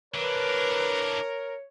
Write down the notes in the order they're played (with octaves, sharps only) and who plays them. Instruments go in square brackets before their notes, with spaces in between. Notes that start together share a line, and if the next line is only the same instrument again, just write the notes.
[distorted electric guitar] E3 D4 [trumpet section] A#4 [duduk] B4 [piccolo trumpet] C#5